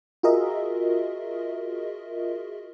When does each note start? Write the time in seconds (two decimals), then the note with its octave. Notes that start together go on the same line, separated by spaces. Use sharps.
0.23 F4 F#4 G#4 A#4 D#5 E5